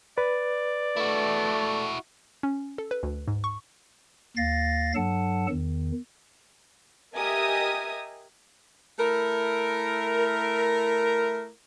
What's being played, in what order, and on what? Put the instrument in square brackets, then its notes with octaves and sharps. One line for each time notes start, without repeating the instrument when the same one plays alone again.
[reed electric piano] B4 [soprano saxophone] D5
[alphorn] A3 [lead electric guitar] E4 F#4
[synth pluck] C#4
A4
B4
D2
G#2
C#6
[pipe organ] D#2 F5 A6 A#6
G2 F#3 A4 F#5 A5
E2 D#3
[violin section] G4 A#4 D#5 E5 G#5 D#6
[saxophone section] A3 E4 A#4